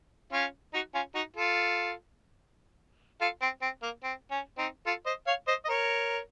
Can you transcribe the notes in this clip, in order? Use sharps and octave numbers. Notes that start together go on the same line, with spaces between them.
C#4 F4
D#4 F#4
C#4 F4
D#4 F#4
F4 A4
F4 A4
C4
C4
A#3
C4
C#4
C4 D#4
F4 A4
C5 D#5
C#5 F5
C5 D#5
D#5
A#4 C#5